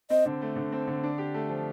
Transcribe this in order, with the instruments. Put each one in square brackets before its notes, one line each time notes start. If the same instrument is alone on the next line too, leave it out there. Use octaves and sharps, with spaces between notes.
[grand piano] C4 [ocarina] D#5
[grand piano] D3
A3
D3
C4
D3
D4
G4
A3
F3